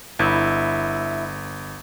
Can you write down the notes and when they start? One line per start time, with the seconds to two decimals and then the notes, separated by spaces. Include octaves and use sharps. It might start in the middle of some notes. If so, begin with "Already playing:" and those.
0.19 G1 E4